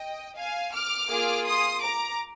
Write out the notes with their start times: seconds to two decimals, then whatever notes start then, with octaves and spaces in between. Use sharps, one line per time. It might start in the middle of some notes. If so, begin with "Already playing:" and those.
Already playing: D#5 G5
0.38 F5 G#5
0.74 D6 F6
1.09 A#3 F4 G#4
1.46 C6 D#6
1.82 A#5 D6